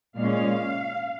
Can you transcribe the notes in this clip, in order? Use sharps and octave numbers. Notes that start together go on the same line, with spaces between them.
A#2 G#3 C#4 F5